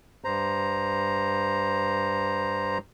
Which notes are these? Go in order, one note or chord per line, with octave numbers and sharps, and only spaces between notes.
G2 C5 A#5